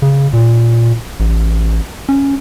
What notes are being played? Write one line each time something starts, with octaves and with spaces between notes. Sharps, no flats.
C#3
A#2
A1
C#4